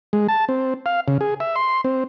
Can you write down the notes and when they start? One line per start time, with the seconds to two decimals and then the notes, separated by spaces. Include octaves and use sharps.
0.13 G#3
0.28 A5
0.49 C4
0.86 F5
1.08 C#3
1.21 G#4
1.40 E5
1.56 C6
1.84 C4